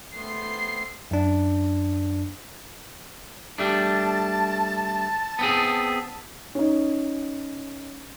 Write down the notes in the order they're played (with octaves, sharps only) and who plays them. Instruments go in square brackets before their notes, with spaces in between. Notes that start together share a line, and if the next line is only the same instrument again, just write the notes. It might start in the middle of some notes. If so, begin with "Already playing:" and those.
[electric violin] A3 C7 [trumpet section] B3 C4 C6
[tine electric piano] F#2 D4
[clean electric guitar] G3 A3 D4 [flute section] A5
[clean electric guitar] B3 C4 G#4
[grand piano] C#4 D#4